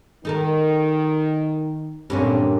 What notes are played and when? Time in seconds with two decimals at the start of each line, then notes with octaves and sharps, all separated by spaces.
0.25 D#3 D#4 A4 A#4
2.10 G2 A#2 D3 A#3 C4 C#4